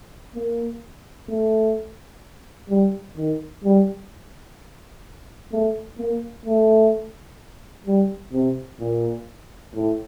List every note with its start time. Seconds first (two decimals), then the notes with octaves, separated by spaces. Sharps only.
0.35 A#3
1.29 A3
2.69 G3
3.17 D#3
3.64 G3
5.52 A3
5.98 A#3
6.46 A3
7.86 G3
8.33 C3
8.80 A#2
9.75 A2